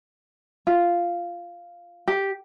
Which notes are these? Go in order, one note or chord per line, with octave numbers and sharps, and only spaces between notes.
F4
G4